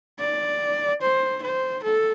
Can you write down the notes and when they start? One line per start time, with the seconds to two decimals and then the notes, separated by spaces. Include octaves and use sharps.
0.20 D5
1.02 C5
1.43 C5
1.84 A4